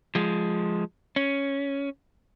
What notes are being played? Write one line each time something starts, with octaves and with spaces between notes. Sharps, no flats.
F3 G#3
C#4